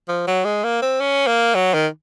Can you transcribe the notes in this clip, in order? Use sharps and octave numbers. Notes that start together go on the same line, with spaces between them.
F3
F#3
G#3
A#3
C4
C#4
A#3
F#3
D#3